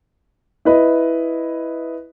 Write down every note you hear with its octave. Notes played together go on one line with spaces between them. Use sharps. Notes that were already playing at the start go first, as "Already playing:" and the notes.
E4 B4 D#5